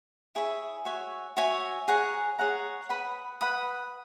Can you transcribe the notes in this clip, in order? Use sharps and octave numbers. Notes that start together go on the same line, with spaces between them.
E4 G#4 C#5 E5
F#4 C#5 E5 G#5
F#4 C#5 E5 G#5
G#4 C#5 F#5 A#5
G#4 C#5 F#5 A#5
B4 F#5 B5 D#6
B4 F#5 B5 D#6